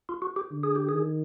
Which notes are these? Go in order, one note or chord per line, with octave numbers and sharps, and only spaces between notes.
F4
F#4
G4
D3
G#4
G4
D#3 G#4